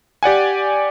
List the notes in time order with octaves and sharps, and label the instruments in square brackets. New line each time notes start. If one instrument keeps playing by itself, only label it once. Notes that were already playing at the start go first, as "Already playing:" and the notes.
[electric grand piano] G4 D5 F#5 G#5